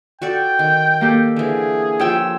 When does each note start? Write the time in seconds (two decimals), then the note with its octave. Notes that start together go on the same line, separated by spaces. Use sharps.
0.22 F#4 A4 D5 G5
0.59 D#3
1.01 A#3 G4 A4
1.36 D3 E3 G#4
2.00 F3 C#4 G4 G5 E6